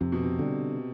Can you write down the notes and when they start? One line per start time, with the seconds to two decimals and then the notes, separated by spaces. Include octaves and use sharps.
0.01 F2 C3
0.12 B2
0.23 C3
0.39 D3 G3